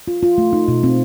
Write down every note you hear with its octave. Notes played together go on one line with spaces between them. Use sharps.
F4
F4
A3
D#4
B2
C4